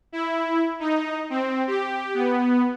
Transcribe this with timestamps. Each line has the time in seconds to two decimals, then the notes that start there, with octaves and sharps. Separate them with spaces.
0.12 E4
0.80 D#4
1.30 C4
1.67 G4
2.14 B3